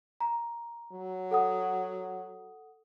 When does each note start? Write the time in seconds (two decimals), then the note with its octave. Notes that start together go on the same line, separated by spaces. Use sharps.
0.20 A#5
0.92 F#3
1.31 A4 F#5 D#6